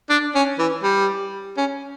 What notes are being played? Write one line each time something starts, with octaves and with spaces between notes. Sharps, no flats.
D4
C#4
E3
G3
C#4